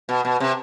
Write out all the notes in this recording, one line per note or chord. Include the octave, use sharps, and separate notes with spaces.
B2
B2
C3